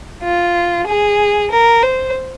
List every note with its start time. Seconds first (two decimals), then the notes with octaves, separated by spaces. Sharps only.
0.23 F4
0.87 G#4
1.51 A#4
1.82 C5